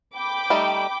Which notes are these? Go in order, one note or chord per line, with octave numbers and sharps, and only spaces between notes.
G5 B5 D6
G3 A3 D#4